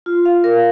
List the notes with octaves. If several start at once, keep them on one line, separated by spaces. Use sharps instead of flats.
F4
F5
A#4